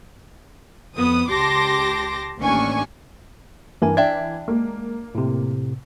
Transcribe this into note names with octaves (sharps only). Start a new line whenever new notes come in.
F2 B3 D#6
C#2 G4 A5 C6 D6 A#6
A1 D#2 C#4 D4 G#5 C#6
G2 E3 A#4 G#5
D4 E5 G5 G#6
G#3 A#3
A2 C3